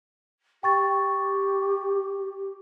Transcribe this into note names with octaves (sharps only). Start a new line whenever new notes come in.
G4 G5 C#6 A6